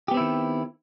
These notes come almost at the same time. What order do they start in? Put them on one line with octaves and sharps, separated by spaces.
G4 B3 C4 E4 D#3